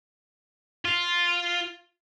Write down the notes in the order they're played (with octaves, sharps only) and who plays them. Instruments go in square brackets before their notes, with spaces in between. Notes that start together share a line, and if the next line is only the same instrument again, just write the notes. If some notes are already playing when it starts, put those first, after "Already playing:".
[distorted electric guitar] F4